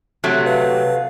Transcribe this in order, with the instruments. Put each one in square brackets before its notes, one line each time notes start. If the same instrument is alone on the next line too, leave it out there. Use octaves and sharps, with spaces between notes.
[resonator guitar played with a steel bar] C3 F#3 A3
[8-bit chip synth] B4 F5